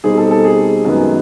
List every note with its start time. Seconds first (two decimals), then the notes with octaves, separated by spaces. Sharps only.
0.04 B2 G3 C4 D#4 G#4
0.18 A4
0.31 A4
0.45 G#4
0.85 F#2 D#3 G#3 B3